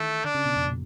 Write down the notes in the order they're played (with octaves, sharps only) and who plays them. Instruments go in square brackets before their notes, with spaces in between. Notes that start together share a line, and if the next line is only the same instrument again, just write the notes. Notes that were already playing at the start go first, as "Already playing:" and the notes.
Already playing: [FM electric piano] D#3 E3 [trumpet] A3
[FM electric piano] D3 [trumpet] D4
[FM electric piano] C#3
B2
F2
A#2